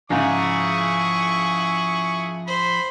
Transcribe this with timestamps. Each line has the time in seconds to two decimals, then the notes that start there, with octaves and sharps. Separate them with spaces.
0.10 G#2 C#3 F3 E4 G#4 A#5 C#6 D6
2.47 C5 B5